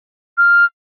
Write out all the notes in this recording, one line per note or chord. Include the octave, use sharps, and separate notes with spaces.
F6